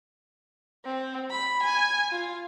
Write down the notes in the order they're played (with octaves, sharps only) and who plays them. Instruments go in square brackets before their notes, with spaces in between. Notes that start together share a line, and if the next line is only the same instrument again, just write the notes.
[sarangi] C4
B5
G#5
F4